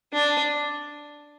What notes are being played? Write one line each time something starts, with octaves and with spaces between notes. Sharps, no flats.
D4